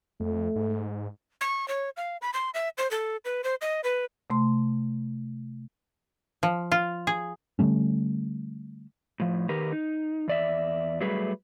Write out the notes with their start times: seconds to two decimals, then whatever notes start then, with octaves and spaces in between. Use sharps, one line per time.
0.20 F2 A3
0.56 G#2
1.41 C#6
1.68 C#5
1.97 F5
2.22 B5
2.34 C6
2.54 E5
2.78 C5
2.91 A4
3.25 B4
3.44 C5
3.61 D#5
3.84 B4
4.30 C3 A3 C6
6.43 F3
6.72 F4
7.07 G#4
7.59 D3 G3 A3 C#4
9.20 A2 F3
9.49 D#3 G4 A#4 B4
9.72 D#4
10.28 E2 D5 E5
11.00 F#3 G3 A3 G#4 B4